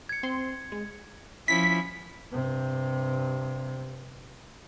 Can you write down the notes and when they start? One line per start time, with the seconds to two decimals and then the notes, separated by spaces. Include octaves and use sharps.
0.09 G#6 C#7
0.23 C4 C6
0.72 G#3
1.48 F3 C#4 E4 B6
2.33 G2 C3